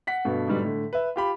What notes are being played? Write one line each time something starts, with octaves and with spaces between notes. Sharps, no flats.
F#5 B6
G2 B2 A3
G#2 B2 D3 G3
A2 D3
B4 E5
F4 G4 B5